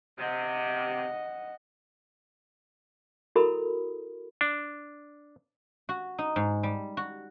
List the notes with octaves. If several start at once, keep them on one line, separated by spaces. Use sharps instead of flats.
C3 D#5 F#5
E4 F#4 A4 A#4 B5 D#6
D4
F#4
D#4
G#2
G3
F#4